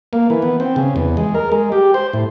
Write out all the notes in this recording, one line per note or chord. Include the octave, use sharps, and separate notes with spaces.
A#3
E3
B3
C4
C#3
E2
G#3
A#4
G#3
G4
C5
A2